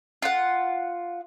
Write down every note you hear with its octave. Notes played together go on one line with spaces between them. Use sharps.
F4 F#5